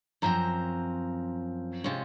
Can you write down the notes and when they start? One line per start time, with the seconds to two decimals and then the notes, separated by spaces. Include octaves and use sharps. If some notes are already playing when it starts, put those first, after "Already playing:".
0.22 F#2 F3 C4 A#5
1.84 C3 F3 G#3 C#4